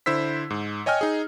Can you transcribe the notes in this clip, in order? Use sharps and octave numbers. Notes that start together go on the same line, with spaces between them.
D3 E4 C5 E6 B6
G#2
C#5 D#5 G5 G#5 F6 G#6
D#4 G#4